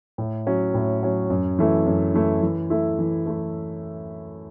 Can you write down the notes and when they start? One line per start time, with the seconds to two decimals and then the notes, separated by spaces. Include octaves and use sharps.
0.18 A2
0.47 F#3 C#4
0.74 A2
1.03 F#3 C#4
1.30 F#2
1.59 E3 A3 E4
1.87 F#2
2.14 E3 A3 E4
2.43 E3
2.70 A3 E4
2.99 E3
3.26 A3 E4